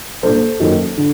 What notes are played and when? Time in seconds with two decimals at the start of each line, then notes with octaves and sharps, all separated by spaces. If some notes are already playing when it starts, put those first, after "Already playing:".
0.23 A#2 G3 D4 A4 C5
0.60 F#2 D#3 F#3 A#3
0.98 D3